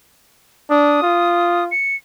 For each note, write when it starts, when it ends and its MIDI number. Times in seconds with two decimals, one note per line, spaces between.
0.70 0.98 62
0.70 1.64 87
1.02 1.71 65
1.71 1.96 97